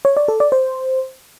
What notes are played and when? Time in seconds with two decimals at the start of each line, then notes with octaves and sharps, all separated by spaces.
0.05 C#5
0.17 D5
0.28 A4
0.40 D5
0.52 C5